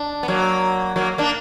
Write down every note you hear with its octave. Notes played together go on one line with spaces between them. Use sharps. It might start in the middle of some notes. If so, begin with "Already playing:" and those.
Already playing: D4
B3
F#3 A#3
F#3 A#3
A#3 D4